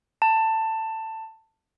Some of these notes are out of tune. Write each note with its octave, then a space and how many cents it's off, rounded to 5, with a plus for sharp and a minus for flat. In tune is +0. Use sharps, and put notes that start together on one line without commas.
A5 +15